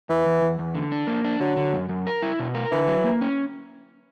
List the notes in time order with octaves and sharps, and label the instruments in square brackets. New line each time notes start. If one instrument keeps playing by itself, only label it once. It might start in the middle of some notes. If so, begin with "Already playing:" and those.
[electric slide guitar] E2 [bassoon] E3
[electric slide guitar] E2
E2
E2
D3
D4
A#3
D4
[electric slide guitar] D3 [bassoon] F#3
[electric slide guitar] D3
F#2
F#2
A#4
E4
B2
A#4
[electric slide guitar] D3 [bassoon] E3
[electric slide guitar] F#3
A#3
C#4